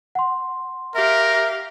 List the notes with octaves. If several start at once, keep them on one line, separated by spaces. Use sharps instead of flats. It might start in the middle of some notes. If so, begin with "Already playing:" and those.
F#5 C6
G4 A#4 E5 F5